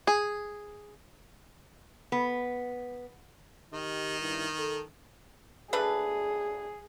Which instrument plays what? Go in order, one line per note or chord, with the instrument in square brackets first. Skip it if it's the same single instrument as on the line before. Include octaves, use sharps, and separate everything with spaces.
[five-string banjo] G#4
[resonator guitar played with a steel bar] B3
[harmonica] D#3 [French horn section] G4 D#5
[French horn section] G2 E4
A4
[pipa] A3 D4 B4 [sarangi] G#4